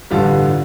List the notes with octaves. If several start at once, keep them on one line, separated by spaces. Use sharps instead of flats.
A1 G2 D3 G3 F4